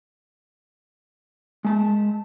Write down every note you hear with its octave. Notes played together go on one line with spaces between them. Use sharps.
G#3 A5